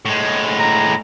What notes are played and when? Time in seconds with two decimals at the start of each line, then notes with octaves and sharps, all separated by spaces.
0.05 A2 G#3
0.59 A#5